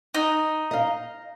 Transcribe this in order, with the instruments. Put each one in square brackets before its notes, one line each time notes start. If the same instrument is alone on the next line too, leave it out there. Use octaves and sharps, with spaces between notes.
[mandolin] D#4
[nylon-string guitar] D#5 F5